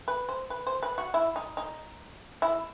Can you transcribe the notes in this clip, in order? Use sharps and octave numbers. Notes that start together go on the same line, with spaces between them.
B4
C5
B4
C5
B4
F#4
E4
D#4
D#4
E4